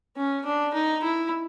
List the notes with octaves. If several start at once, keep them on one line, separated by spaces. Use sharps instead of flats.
C#4
D4
D#4
E4